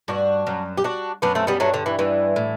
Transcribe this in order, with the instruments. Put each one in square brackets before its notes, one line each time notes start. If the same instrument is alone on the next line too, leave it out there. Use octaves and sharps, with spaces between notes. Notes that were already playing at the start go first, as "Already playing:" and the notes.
[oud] G2 [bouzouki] D4 F#4
[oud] F#2
[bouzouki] G4
D4 F#4
[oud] F#2 [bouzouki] B3 D4
[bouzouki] A3 C4
G3 B3
[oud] G2 [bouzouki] F#3 A3
[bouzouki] D3
E3
[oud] G2 [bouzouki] E3
[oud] A2